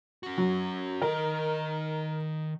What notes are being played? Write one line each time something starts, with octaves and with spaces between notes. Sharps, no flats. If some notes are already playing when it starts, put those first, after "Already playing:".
C#4 F#4
F#3
D#3 A#4 D#5